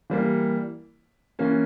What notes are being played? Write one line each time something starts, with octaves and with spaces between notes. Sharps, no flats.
E3 G3 A#3
E3 A#3 C#4